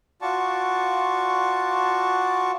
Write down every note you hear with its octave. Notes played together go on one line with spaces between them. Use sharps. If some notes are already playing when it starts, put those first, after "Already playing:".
F4 F#4 D5 A5 C#6